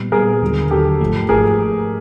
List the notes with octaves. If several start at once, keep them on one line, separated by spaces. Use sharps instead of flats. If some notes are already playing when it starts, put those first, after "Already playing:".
Already playing: A#2 G3 B3
A#2 G3 B3 G#4 A#4
D#2 D3 F#3
D#2 D3 F#3 G4 A4
G#1 G#2 F3 A3
G#1 G#2 F3 A3 G#4 A#4